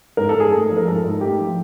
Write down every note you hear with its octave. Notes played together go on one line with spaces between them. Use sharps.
G#2 A#4
A4
G#2 G#4
A3 A4
F3
A#4
G#2 A4
G#2
A3 G4
F3